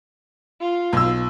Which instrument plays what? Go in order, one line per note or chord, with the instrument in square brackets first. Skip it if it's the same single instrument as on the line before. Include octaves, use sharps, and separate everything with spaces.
[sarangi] F4
[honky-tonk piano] B1 E6